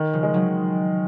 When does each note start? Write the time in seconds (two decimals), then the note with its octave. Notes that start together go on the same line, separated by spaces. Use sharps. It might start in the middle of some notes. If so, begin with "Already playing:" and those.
Already playing: D#3
0.13 C#3 F3
0.23 G#3
0.34 D#3 F#3